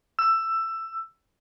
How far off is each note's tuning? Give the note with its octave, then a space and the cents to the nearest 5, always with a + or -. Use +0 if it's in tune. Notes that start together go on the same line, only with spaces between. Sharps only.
E6 +15